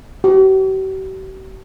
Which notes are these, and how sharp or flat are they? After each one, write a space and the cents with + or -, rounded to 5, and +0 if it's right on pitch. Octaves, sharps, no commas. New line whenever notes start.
G4 -45